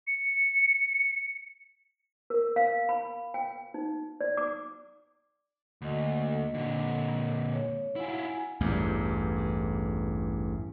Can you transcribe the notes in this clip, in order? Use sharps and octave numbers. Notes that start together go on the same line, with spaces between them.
C#7
A#4
F5
B5
G5
D#4
D5
D6
D2 A#3 D#5
A#2 D3
C#5
E4 F4 F#5 G#5
A1 E2 G2